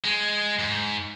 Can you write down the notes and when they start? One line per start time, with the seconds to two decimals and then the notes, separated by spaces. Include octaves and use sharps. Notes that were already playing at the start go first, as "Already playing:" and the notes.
0.05 G#3
0.59 G#2